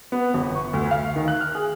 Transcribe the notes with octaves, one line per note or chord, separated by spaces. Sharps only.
B3
G1
C#6
D2
F5
D#3
F#6
F6
G#4